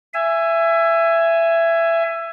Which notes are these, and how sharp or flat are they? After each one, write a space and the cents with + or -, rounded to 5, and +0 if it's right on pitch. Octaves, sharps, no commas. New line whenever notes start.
E5 +20 G#5 +0